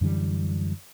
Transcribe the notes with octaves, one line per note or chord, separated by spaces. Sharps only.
F#2 D3 E3 G3